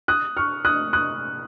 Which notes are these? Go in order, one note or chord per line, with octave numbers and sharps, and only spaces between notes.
D#6 F#6
C#6 F6
D#6 F#6
D#6 F#6